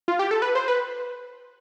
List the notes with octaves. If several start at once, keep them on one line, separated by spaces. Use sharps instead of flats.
F4
G4
A4
B4
C5
B4